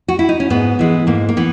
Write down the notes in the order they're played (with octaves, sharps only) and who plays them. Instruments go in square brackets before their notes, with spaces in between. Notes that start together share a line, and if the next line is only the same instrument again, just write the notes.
[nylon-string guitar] F#4
E4
D#4
C#4
G#2 B3
E3 G#3
G#2 A#3
A#3
E3 B3